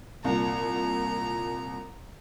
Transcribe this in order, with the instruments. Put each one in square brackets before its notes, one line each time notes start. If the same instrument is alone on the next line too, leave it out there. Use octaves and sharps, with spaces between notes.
[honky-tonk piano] C2 A#2 [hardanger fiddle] A#5